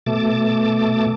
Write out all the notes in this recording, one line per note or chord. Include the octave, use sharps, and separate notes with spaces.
B2 A3 A5 D6